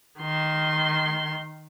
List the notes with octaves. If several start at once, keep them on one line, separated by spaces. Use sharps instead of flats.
D#3 C6